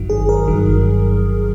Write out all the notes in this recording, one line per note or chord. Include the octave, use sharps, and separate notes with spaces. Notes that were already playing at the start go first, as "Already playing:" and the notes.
Already playing: G1 G2 D#3 F#3
G#4
A#4
G1 G2 D#3 F#3